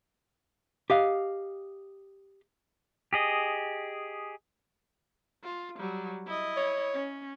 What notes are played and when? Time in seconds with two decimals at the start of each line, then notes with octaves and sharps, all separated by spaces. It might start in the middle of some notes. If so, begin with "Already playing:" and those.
0.90 G4 D#5 F5
3.13 G4 G#4 D#5
5.43 F4
5.79 F#3 G3
6.27 E4 D#5
6.57 C#5
6.94 C#4